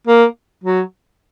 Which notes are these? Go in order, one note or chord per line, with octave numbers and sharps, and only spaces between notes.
A#3
F#3